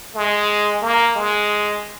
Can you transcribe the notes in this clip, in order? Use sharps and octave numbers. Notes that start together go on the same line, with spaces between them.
G#3
A#3
G#3